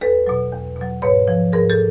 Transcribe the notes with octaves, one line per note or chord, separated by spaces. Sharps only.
E2 A4 B4
B2 F#3
E2
B2 F#3
G#2 B4 C#5
F3
G#2 G#4 A#4
G4 A4